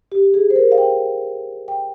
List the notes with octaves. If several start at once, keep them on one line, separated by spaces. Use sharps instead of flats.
G4
G#4
C5
A#4
F5
G5
G5